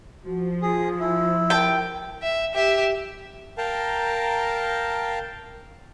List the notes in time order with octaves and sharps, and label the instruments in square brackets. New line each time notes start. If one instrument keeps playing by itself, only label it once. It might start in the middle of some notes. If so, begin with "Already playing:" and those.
[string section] F3 [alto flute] F#4
[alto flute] F4 [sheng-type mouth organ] G#4
[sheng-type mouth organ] E4
[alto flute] A#4 [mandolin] G5 A5
[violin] E5
G4 E5
[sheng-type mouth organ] A#4 F5 G5 A5 A#5